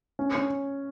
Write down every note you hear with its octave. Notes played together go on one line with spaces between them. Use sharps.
C#4
C#4